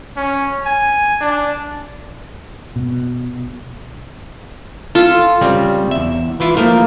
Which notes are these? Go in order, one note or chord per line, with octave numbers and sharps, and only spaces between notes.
C#4
G#5
D4
B2
F4 A4
C#3 G3 C4
E2 E5
E3 E4 F4
F3 A3 A#3 F5